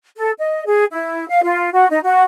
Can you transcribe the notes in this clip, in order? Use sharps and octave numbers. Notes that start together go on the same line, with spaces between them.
A4
D#5
G#4
E4
F5
F4
F#4
D#4
F#4